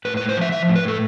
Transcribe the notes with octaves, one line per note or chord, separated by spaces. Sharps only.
A2 B4
B4
A2
C5
F3 E5
F3 E5
A2
B4
A2 A4